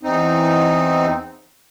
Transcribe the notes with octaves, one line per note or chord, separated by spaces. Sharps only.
E2 C4 D#4